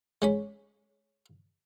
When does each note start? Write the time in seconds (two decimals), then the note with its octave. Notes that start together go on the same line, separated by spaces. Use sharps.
0.22 G#3 C#4 B5